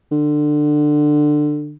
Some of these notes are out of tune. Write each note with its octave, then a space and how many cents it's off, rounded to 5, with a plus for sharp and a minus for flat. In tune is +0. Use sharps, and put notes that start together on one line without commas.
D3 +20